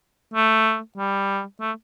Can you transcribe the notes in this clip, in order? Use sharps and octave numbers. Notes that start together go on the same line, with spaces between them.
A3
G3
A3